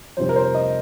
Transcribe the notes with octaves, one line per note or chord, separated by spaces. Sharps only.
F2 C3 G3 C5
A#4
C5
D#5